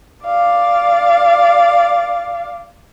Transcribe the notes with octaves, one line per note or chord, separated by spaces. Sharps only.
D5 F5